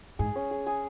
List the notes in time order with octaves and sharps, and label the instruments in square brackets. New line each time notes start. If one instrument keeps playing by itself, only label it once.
[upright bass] G#2 [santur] G#4
[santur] C#4
G#4
G#4